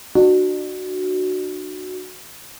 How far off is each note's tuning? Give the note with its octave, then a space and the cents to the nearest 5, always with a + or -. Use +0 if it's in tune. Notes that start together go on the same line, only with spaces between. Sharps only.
D4 +40 F#4 +0